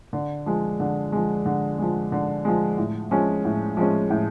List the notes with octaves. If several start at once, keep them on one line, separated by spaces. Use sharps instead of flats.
D3
F3 G#3
D3
F3 G#3
D3
F3 G#3
D3
F3 G#3
A2
F3 G#3 C#4
A2
F3 G#3 C#4
A2